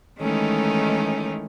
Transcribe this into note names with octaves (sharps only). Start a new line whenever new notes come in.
D#3 E3 G#3 A3 C#4 D#4